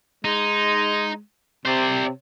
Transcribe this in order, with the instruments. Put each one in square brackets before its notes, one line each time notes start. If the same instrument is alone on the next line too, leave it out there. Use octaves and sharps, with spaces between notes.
[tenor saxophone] G#3 [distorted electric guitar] D#4
[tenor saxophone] C3 [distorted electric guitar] C5 D5